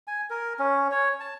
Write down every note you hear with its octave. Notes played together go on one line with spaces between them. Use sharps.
G#5
A#4
C#4
C#5
A5